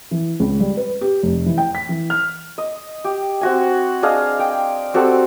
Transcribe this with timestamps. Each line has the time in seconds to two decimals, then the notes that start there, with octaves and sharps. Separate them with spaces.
0.11 E3
0.40 C#2
0.60 G3
0.77 B4
1.01 G4
1.23 F1
1.46 E3
1.58 G5
1.75 B6
1.89 E3
2.10 F6
2.58 D#5
3.04 G4
3.41 C4 F#4 G#5
4.03 D4 G#4 D#5 F5
4.39 G5
4.94 C4 F#4 G4 A4